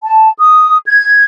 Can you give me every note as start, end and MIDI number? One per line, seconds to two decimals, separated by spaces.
0.04 0.29 81
0.39 0.78 87
0.86 1.24 92